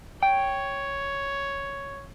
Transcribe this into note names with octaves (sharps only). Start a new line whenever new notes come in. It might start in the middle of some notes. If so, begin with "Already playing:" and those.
C#5 G5